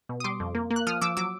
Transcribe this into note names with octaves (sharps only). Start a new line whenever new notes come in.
B2
D#6
G3 C6 D6
F2
A#3
A#3
F#6
F3 D#6 F6
F3 D6 E6
F#3 D6 E6